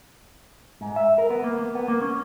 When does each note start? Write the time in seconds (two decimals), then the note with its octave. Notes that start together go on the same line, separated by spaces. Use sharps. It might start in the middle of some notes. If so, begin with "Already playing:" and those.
0.81 G#2
0.96 E5
1.18 A#4
1.30 B3
1.44 A#3
1.59 A#3
1.75 B3
1.88 A#3
2.02 C#4